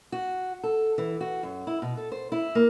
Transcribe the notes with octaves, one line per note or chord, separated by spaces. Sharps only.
F#4
A4
E3
F#4
F#2
E4
B2
A4
C5
E4
A#3